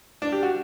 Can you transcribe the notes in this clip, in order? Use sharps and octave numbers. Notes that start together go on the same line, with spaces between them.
D4
G4
F#4